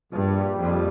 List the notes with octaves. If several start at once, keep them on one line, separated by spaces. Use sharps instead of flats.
A#1 G2 A#2 G3
F2